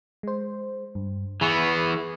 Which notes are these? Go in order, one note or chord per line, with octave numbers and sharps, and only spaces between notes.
G#3 C5
G2
E3 B3 G#4 B5 C#6